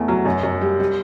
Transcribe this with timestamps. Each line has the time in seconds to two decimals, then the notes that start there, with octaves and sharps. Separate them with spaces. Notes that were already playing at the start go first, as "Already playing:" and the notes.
Already playing: E2 A3
0.08 F#3
0.25 F#2
0.43 F#2
0.61 G3
0.80 G3